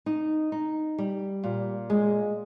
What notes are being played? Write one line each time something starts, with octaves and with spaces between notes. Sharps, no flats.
D#4
D#4
G3
A#2
G#3